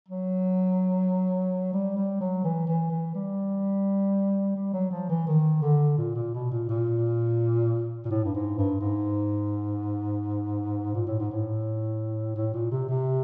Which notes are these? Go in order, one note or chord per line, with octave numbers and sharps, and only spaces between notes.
F#3
G3
G3
F#3
E3
E3
E3
G3
G3
F#3
F3
E3
D#3
D3
A#2
A#2
B2
A#2
A#2
A#2
A2
G2
G#2
G2
G#2
A#2
A2
G#2
A2
A2
A#2
C3
C3